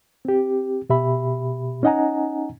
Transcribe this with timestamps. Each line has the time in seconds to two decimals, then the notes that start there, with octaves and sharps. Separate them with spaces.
0.25 C4 G4
0.90 B2 G4 E5 B5
1.83 C#4 D#4 D#5 F#5 G#5 A#5